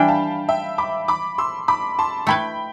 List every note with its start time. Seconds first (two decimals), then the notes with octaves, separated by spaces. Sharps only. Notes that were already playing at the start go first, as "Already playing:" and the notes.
Already playing: E3 G3 D4 G5 B5
0.08 F5 A5
0.49 E5 G5
0.78 B5 D6
1.08 B5 D6
1.38 C6 E6
1.68 B5 D6
1.99 A5 C6
2.27 A3 E4 B4 G5 B5